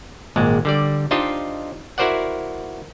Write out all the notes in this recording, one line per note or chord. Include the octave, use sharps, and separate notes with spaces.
G#1 A#2 G#3
D3 G3 D5
D4 D#4 F4 G4 C5 D#5
E4 F#4 A#4 C5 D5 F#5